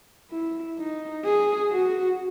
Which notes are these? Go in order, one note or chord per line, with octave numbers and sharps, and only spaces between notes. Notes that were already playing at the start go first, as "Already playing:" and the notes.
E4
D#4
G#4
F#4